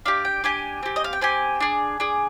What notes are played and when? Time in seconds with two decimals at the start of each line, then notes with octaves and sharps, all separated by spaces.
0.06 D4 G4 F5
0.25 G5
0.44 D4 G4 G#5
0.83 C4 G4
0.96 D#5
1.04 F5
1.13 G5
1.21 C4 G4 G#5
1.60 D4 G#4
2.00 D4 G#4